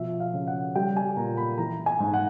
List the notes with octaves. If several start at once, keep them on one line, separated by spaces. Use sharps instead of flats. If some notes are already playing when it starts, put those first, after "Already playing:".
Already playing: B2 F3 E5
F5
C#3
F#5
G3 G5
G#5
A#2 A#5
B5
E3 A#5
G#5
G#2
F#5